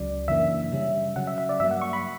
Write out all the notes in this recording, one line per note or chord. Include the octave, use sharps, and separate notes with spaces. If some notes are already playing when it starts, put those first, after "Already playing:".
Already playing: C#2 C#3 F#3 D5
F#2 C#3 E3 A#3 D4 E5
C#3 G3 C#4
C#3 F#3 C#4 F#5
E5
E5
D5
G2 F#3 A#3 E5
F#5
C#6
B5